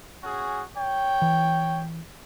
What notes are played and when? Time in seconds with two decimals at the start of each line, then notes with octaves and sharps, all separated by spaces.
0.24 C#4 F#4 G#4
0.77 C#5 G5
1.22 E3